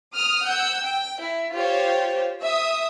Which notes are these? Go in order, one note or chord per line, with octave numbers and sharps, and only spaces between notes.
D#6 F6
F#5 E6 G6
G5
E4
F4 G4 C5 C#5
E5 D#6